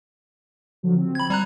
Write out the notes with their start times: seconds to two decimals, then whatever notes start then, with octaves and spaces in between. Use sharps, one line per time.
0.83 D3 F3 F#3
0.96 C4
1.15 B5 G#6
1.30 G3 A#5 F#6